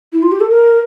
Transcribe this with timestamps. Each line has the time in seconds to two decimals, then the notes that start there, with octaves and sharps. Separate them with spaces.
0.13 E4
0.22 F4
0.32 G4
0.40 A4
0.50 A#4